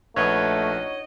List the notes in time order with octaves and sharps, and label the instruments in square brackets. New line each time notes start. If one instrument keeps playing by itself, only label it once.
[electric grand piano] A#1 B4 F#5 [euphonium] A3 [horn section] D#4 F#4 D#5 [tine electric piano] C#5